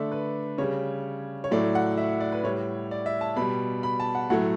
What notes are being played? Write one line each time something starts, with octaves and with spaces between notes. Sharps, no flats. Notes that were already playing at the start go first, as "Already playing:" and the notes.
Already playing: D3 A3 D5 E5
B4
C#3 G3 C#5
C#5
A2 F#3 A3 D5
F#5
E5
D5
B4
A2 G3 C#5
D5
E5
A5
B2 G3 B5
B5
A5
F#5
A2 F#3 A3 F#5